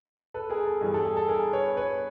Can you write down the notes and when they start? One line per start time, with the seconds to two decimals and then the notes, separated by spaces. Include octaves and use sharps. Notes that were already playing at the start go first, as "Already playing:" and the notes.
0.34 A4 B4
0.50 G#4 A#4
0.65 A4
0.81 G2 E3 G3 G#4
0.94 A4
1.05 G#4
1.17 A4
1.29 G#4 A#4
1.53 B4 C#5
1.77 B4 C#5